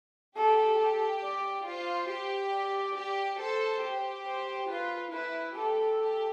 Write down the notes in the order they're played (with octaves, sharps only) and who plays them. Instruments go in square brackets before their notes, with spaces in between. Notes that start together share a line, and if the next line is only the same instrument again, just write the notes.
[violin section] G4 [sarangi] A4
[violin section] G4
[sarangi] D5
[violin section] F4 [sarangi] C5
[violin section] G4
[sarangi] D5
[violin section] G4
[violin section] A4 [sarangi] C5
[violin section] G4
[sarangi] C5
[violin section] F4 [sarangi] B4
[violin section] E4 [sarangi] B4
[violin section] G4 [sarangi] A4
[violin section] G4